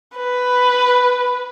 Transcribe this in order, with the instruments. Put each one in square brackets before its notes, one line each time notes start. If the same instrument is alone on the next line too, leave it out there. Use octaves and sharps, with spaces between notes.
[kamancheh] B4